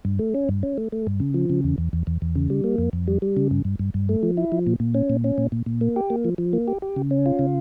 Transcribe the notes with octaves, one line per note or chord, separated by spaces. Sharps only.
G2
A3
C#4
G2
C#4
A3
A3
G2
C#3
F3
C#3
E2
E2
E2
E2
E2
C#3
G3
A#3
F2
F2
G3
G3
C#3
G2
G2
G2
G2
A3
F3
E4
F3
A#2
A#2
C#4
A#2
C#4
A#2
A#2
A#2
A#3
G4
A#3
F3
F3
A#3
G4
G4
C#3
C#4
F4
C#3